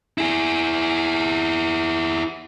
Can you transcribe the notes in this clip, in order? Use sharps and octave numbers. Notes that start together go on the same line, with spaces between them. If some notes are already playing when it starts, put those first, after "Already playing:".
E4 G#4